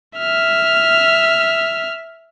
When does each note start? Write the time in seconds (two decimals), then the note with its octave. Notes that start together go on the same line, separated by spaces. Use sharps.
0.18 E5 F6